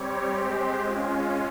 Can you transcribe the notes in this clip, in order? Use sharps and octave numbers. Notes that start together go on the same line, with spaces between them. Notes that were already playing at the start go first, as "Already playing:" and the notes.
Already playing: G3 C4 G4 C#5
G#3 C4 G4 C5
G#3 C#4 F4